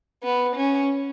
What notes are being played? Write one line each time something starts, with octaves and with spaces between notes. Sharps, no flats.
B3
C#4